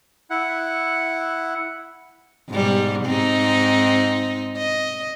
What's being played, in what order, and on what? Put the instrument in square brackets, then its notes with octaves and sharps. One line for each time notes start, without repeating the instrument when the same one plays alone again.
[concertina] E4 F#5
[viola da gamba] G#2 B2 G3
G#2 C4 D#4
D#5